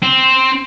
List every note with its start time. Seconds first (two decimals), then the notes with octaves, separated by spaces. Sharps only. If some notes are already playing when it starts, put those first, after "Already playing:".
0.02 C4